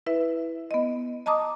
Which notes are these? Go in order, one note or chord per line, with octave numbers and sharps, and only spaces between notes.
E4 B4 E5
B3 D#5
D#5 A5 A#5 D6 D#6